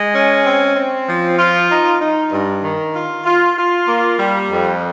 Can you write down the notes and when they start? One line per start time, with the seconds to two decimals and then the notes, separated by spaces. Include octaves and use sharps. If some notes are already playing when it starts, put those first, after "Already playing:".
Already playing: G#3
0.14 C#4
0.46 C4
0.76 C4
1.08 F3
1.39 F4
1.70 D#4
2.00 D#4
2.32 G2
2.63 D#3
2.94 F4
3.25 F4
3.56 F4
3.88 A#3
4.18 G3
4.50 F2